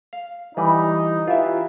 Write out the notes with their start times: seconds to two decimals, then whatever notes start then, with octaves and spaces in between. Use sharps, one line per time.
0.13 F5
0.57 E3 G3 D#4 B4
1.28 E3 F4 G4 E5